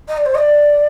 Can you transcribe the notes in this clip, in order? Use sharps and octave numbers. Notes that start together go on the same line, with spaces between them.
D#5
D5
C5
D#5
D5